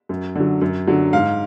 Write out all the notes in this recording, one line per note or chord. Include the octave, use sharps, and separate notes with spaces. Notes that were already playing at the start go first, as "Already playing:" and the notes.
F#2
D3 F#3
F#2
D3 F#3
G#2 F5